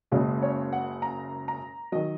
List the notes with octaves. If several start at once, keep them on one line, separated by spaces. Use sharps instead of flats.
F#1 F#2 C#3 G#3 C#4 D#5
C#5
F#5
A#5
A#5
D#3 F#3 D#5